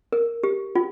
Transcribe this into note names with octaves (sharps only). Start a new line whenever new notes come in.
A#4
G4
F4